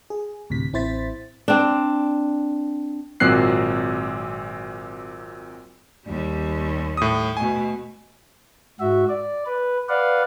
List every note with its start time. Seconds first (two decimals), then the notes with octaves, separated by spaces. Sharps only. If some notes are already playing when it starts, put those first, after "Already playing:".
0.10 G#4
0.50 D2 A2 C3 B6
0.73 A1 C4 E4 C5 A6 B6
1.48 C4 D4
3.20 G#1 A#2 F#3 C4 F#6 C7
6.07 D#2 G3
6.97 A2 D#6
7.37 B2 A3 G#5
8.80 G#2 F#4 E5
9.09 D5
9.46 B4
9.89 B4 D5 F5 F#5